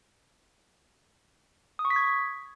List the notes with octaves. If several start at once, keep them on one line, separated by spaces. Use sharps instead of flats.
D#6
C#6
B6
G#6